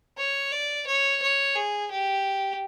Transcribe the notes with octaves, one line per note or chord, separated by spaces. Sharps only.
C#5
D5
C#5
C#5
G#4
G4